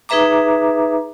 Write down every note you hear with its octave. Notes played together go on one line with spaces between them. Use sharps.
D#4 G#4 B4 E5 A#5 D6